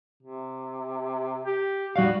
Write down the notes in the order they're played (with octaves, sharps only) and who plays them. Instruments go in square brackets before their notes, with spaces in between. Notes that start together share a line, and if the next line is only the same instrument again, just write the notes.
[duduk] C3
G4
[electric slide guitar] G3 D5 F5 [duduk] F#4